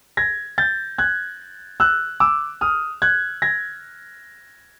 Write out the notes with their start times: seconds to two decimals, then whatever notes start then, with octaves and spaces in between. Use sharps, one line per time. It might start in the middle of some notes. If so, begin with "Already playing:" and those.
0.17 G#6 A#6
0.58 G6 A6
0.98 F#6 G#6
1.80 E6 F#6
2.20 D6 E6
2.61 D#6 F6
3.02 F#6 G#6
3.42 G#6 A#6